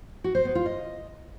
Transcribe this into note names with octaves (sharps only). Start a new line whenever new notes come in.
F#4
C5
B3
F4
D#5